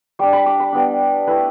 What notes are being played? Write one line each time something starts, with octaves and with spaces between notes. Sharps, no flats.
G3 D4 D6
B5
D6
B5
G3 B3 D4
A3 E4 B4